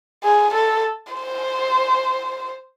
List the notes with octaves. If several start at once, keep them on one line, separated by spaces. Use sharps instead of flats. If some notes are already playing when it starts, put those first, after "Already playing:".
G#4
A4
C5